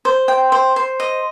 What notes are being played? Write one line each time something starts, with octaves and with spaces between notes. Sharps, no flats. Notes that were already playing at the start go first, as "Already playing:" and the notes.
C5
G5
C5
C5
D#5